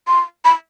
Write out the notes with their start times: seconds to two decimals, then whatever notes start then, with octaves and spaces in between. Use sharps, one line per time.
0.07 C6
0.45 B5